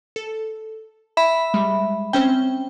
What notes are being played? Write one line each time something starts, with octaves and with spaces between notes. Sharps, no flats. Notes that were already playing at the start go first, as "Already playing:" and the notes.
A4
E5 B5
G3 G#3
C4 C#4 C5 G5